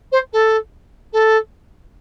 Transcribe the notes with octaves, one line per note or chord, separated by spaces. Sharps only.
C5
A4
A4